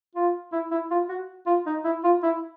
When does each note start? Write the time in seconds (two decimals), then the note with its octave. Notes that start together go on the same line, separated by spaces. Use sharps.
0.15 F4
0.52 E4
0.71 E4
0.91 F4
1.09 F#4
1.46 F4
1.66 D#4
1.84 E4
2.04 F4
2.23 E4